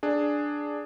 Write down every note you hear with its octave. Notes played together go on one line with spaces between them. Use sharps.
D4 G#4